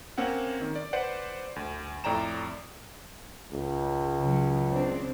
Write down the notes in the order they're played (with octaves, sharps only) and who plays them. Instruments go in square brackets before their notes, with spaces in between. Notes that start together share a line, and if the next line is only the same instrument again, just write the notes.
[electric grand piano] A#3 C4 C#4 F#5
D#3
D5
B4 C5 D5 F#5
D2
F2 A2 D5 G5 A#5 E7
[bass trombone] C#2
[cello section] C#3 F#3
C#3 C4 D4